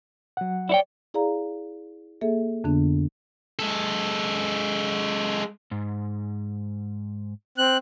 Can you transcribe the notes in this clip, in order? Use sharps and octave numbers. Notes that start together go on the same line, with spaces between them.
F#3 F#5
E4 C#5 D5 G5
E4 G#4 D5 F5 A#5
A#3 G#4 A4 E5
F2 D3 B3 D4
G#3 A4
G#2
C4 F#6